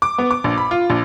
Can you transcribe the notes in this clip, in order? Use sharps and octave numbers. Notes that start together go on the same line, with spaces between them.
D6
B3
D6
A#1
B5
F4
A#1